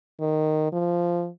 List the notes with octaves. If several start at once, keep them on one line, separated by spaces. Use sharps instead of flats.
D#3
F3